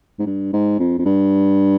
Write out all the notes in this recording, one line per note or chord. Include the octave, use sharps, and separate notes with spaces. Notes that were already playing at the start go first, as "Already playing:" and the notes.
G#2
G2
G#2
F2
F2
G2